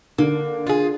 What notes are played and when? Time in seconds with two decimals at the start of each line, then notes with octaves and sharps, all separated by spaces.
0.18 D3 A#3
0.67 F4 G#4